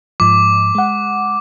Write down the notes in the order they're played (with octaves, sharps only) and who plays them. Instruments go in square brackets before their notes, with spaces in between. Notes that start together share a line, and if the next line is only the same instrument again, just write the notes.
[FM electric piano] G#2 F3 [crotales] D6
[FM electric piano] G#3 F#5